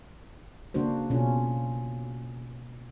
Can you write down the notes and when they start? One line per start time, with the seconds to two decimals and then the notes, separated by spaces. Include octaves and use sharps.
0.74 C#3 A#3 D4 F#4 C5
1.10 B2 C#4 F4